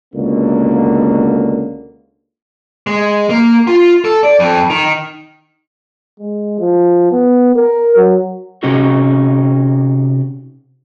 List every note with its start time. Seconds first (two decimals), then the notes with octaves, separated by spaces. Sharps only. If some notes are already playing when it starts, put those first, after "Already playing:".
0.15 C#2 B2 D3 A#3
2.87 G#3
3.30 A#3
3.67 F4
4.05 A4
4.23 D5
4.40 F2
4.70 D#3
6.20 G#3
6.60 F3
7.11 B3
7.56 A#4
7.96 F#3
8.63 C3 C#4 D#4 F#4 G#4